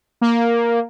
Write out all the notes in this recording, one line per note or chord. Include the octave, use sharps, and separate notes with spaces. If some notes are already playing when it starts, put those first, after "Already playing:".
A#3